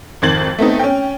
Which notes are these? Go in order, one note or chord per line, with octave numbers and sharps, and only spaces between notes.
G#1 F2 D#3 G#6 A6 F#7
A3 B3 C4 D#4
C#4 G5